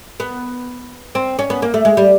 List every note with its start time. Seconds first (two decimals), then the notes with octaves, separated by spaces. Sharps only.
0.20 B3
1.15 C4
1.39 C#4
1.50 B3
1.62 A#3
1.74 A3
1.85 G#3
1.97 G3